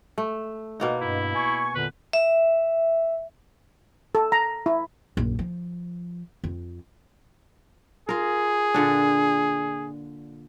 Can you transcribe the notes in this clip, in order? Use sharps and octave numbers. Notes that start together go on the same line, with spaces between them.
A3
B2 A#3 D#4
G2 E4
G#5 C#6
E2 A#2 D3 B4
E5
A4
A#5
E4
A#1 F#2
F3
F2
F4 G#4 A#4
A#2 D3 D4